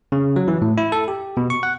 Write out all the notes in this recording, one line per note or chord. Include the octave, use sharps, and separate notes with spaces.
C#3
F#3
E3
A2
E4
A4
G4
B2
C#6
F#5